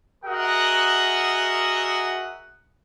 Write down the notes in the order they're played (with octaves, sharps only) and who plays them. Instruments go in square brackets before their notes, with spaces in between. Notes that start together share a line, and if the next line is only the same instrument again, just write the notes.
[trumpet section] F#4 G#4 A#4 D#5 E5 F#5